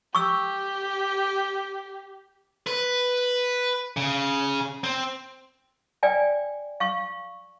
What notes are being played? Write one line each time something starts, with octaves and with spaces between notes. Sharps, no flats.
G4 C#6 E6
B4
C#3
C4
D5 G5 G#5
F5 C#6